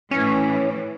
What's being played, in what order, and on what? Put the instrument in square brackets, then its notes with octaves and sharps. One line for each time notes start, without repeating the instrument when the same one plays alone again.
[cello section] A2 E3 [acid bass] C#4